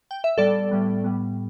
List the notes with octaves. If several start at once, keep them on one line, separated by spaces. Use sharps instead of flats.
G5
E5
A2 G3 B3 A4 D5
A2 G3 B3
A2 G3 B3